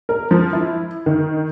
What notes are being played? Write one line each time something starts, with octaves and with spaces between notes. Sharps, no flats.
A#4
F3
E4
D#3